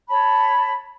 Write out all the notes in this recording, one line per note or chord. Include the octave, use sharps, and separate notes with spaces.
C#5 A5 B5